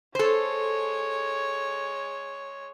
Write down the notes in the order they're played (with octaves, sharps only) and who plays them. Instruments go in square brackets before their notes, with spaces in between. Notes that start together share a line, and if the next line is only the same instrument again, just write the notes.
[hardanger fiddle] G#3 C#5 [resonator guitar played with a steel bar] A4 C5